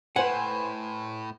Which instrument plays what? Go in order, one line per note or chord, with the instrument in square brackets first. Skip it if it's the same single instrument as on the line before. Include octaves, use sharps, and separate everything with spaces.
[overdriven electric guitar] A2 [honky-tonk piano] B4 C5 G#5 [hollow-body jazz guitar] F#5